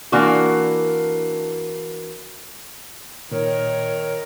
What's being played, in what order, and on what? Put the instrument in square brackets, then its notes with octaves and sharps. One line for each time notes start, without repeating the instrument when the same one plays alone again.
[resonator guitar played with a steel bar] E3 A#3 D4 F#4
[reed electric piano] A#2 [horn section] D#3 A#4 [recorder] C#5